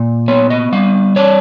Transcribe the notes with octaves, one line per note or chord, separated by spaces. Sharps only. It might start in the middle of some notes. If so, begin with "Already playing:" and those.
Already playing: A#2
B3 C#5
D#5
G3 F5
D4 C#5